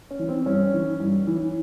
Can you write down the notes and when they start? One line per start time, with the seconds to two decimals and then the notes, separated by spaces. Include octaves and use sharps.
0.11 C#4
0.19 E3
0.29 C4
0.46 G2 C#4
0.73 E3
1.00 G2
1.27 E3